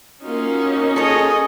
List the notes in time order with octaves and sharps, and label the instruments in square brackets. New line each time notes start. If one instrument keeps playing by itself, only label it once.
[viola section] A#3 F4 F#4 [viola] C#4 D#4
[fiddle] G#4 D#5 [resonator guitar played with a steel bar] A4 C#5